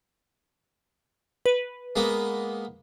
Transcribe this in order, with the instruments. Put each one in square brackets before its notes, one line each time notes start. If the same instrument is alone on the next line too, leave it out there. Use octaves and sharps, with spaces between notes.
[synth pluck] B4
[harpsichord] G#3 A#3 B3